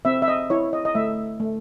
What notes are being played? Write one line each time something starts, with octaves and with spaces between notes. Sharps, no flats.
C4 E5
E5
D#5
E4 C#5
D#5
D#5
A3 E5
A3